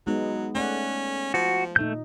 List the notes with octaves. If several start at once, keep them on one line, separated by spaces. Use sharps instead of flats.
F#3 G#3 B3 D#4
A3 C#4 D5 F#5
F3 F#4
A#2 A3 D#4 G6